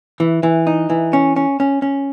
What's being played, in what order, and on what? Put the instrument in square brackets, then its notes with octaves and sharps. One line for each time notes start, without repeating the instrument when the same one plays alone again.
[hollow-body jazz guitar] E3
E3
D#4
E3
C#4
C#4
C#4
C#4